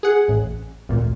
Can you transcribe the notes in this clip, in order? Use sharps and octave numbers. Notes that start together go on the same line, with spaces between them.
G#4 F#5
A1
G#1 D2 A#2